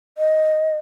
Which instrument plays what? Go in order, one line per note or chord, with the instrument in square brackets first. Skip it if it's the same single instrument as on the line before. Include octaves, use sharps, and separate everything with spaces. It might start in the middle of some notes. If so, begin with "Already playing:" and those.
[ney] D#5